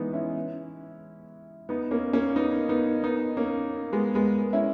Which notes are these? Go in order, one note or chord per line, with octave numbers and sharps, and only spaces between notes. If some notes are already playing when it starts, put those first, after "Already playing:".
Already playing: E3 G#3 B3 D#4
C#4 E4
B3 D#4
A#3 C#4
A#3 C#4
B3 D#4
B3 D#4
B3 D#4
A#3 C#4
G#3 B3
G#3 B3
C#4 E4